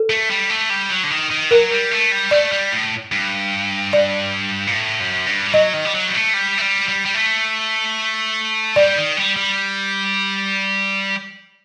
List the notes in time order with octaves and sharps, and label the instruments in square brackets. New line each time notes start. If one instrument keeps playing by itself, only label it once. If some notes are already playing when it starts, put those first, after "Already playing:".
Already playing: [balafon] A4
[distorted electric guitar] A3
G3
A3
G3
F#3
D3
D#3
D#3
[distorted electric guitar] F#3 [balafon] A#4
[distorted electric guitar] G3
A3
G3
[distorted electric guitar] A3 [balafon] D5
[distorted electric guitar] G3
A2
G2
[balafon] D5
[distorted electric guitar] A#2
A2
F#2
G2
G3
[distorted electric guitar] F#3 [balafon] D#5
[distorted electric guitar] D#3
G3
F#3
G3
A3
G3
A3
G3
G3
G3
A3
[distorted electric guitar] G3 [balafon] D5
[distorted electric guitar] D#3
G3
G3